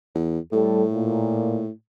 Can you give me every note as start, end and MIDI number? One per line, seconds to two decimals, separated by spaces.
0.15 0.39 40
0.52 1.70 45
0.52 0.82 55
0.52 0.82 69
0.90 1.63 46